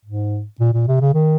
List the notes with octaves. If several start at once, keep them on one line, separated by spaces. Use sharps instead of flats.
G#2
A#2
A#2
C3
C#3
D#3